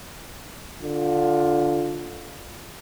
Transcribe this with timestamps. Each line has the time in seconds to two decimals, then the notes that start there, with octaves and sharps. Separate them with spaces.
0.82 D3 F4